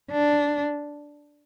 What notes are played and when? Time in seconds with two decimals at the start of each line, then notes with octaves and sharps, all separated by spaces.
0.11 D4